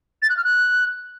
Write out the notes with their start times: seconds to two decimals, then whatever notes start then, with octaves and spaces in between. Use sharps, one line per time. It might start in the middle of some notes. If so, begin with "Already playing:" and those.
0.22 A6
0.30 F#6
0.37 F6
0.44 F#6